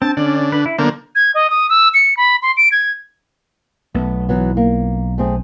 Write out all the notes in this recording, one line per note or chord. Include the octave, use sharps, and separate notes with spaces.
C4 D4 A5
D3 C#4 D4 D5
B4
E4
D3 F#3 A#3 B3 C5
G#6
D#5
D#6
E6
C#7
B5
C6
D7
G#6
B1 A3 B3
E3 F#3 B3
A#3
A3 C4 G#4